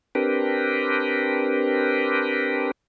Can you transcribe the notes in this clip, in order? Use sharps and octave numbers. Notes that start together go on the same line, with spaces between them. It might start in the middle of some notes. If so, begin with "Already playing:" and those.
C4 D4 G4 A#4 B4